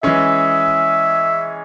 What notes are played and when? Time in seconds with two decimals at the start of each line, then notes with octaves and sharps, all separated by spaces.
0.03 E3 G#3 C#4 G#4 E5